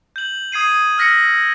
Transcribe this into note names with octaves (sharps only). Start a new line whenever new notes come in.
G6 F#7
D#6 G#6 C7 D#7
E6 F6 A#6 B6 C#7